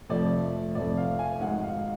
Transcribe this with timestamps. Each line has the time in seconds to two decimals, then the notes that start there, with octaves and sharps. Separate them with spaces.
0.09 F1 F2 F3 A3 D5
0.75 F1 F2 F3 A3 D5
0.97 F5
1.19 G#5
1.41 G#1 G#2 G#3 F#5
1.63 F5